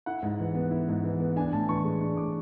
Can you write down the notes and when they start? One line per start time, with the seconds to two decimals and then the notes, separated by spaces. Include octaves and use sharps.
0.06 E4 F#5
0.23 G#2
0.40 E3
0.55 B3
0.71 E4
0.88 G#2
1.04 E3
1.20 B3
1.36 D4 G#5
1.53 A2 A5
1.69 E3 C#6
1.84 G#3
2.01 D4
2.17 A2 D6